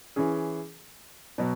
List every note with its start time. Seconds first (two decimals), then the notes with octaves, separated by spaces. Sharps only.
0.16 E3 C#4 G#4
1.38 B2 F#3